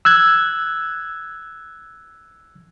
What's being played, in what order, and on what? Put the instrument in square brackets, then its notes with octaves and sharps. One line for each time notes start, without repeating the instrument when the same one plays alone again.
[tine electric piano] E6 F#6 G#6